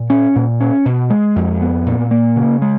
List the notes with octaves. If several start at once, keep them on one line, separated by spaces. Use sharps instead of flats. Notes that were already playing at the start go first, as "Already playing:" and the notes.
Already playing: A#2
C#4
A#2
C#4
B2
G#3
F2
B3
A#2
A#3
C#3
G#3